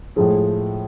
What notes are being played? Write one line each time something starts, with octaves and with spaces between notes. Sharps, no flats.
A2 F3 G#3 G#4